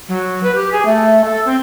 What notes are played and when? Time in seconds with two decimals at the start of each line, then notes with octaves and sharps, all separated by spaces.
0.08 F#3
0.43 B4
0.55 G4
0.72 G#4
0.85 A3
1.24 A4
1.45 C4